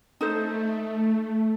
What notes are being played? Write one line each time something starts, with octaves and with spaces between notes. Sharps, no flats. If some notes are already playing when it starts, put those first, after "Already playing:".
A3 D#4 A4 C5